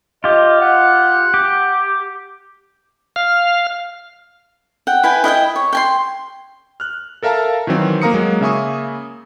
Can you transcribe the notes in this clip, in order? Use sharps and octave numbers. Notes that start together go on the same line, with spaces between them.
F4 G4 D#5
F#5
G4
F5
F#5 G5
E4 B4 G5 G#5
E4 D#5 F5 G5
C#5
G5 G#5 C6
F6 F#6
A4 A#4 E5 F5 A5 A#5
D#3 E3 F#3 C4
A#3 A#4 F5 A#5 D#6 C#7
F#3 G#3 A#3
C#3 A#3 E5 G#5 C#6 D#6